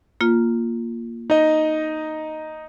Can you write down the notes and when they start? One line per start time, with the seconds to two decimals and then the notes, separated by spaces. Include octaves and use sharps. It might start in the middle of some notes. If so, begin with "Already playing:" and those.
0.21 A#3 F4
1.30 D#4 D#5